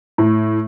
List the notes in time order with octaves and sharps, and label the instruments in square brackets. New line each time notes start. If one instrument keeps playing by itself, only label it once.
[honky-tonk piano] A2